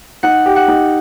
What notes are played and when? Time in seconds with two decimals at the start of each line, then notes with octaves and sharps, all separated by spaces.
0.23 D#4 F#5
0.46 G4
0.56 F#5
0.68 D#4